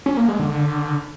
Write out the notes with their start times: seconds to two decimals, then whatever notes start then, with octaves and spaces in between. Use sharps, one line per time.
0.06 C#4
0.17 A#3
0.28 G#3
0.39 D3